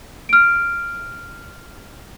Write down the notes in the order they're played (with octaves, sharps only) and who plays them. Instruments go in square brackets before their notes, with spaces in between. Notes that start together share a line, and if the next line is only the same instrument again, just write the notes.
[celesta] F6 D7